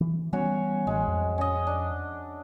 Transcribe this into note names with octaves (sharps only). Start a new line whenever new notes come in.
E3
E3 G3 B3 C#4 F#4 C#5
A1 G#3
F2
C#4 D#5
D4